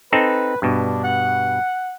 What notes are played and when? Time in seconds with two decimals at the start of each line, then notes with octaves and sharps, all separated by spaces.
0.12 C4 D#4 A4 B4
0.62 G2 B2 D4
1.04 F#5